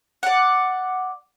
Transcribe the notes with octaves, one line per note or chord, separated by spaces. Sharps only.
D5 F#5